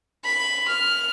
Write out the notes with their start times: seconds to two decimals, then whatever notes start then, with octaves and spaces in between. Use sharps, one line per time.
0.24 B5
0.68 F6